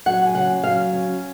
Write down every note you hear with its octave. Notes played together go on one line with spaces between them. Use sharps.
F#3 F#5
G#5
C#3 F#5
F#3 F5
C#4